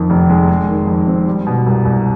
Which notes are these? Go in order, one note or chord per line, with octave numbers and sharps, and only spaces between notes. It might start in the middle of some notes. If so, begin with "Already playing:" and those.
Already playing: F2 D#3
F1
G#3
G#3
D#3
F2
C4
G3
B2
C2
C2